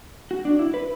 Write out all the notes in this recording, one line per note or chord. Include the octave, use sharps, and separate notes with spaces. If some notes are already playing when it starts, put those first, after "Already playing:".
F#4
D4
E4
B4